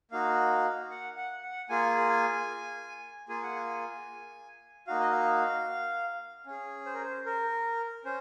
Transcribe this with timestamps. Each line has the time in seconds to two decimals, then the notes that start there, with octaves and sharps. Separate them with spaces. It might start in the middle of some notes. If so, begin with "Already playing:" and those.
0.11 A#3 D#4 F#4 F5
0.91 F#5
1.17 F#5
1.43 F#5
1.69 A#3 F4 G#4 G#5
2.10 G#5
3.29 A#3 F4 G#4 G#5
3.43 F#5
3.55 G#5
4.87 A#3 D#4 F#4 F5
5.00 D#5
5.11 F5
6.46 C#4 G#4
6.86 C5
6.94 A#4
7.03 C5
7.26 A#4
8.05 C#4 C5